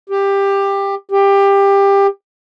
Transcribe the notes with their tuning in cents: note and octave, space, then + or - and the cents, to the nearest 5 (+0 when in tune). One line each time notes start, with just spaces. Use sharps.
G4 +15
G4 +20